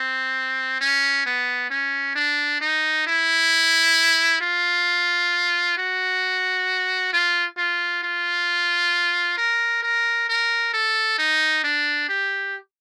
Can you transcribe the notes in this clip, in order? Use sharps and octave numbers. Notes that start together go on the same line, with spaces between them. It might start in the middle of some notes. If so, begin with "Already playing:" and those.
Already playing: C4
C#4
B3
C#4
D4
D#4
E4
F4
F#4
F4
F4
F4
A#4
A#4
A#4
A4
D#4
D4
G4